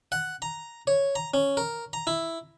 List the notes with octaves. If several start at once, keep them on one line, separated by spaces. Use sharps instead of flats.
F#5
A#5
C#5
A#5
C#4
A#4
A#5
E4